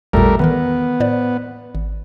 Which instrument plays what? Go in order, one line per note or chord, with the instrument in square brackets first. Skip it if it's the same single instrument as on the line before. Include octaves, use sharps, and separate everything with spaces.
[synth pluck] A1 E2 A#2 [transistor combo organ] G3 A3 A#4
[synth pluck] D#3 E3 A#4 [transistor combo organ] B3
[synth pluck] A2 C5 D5
G#1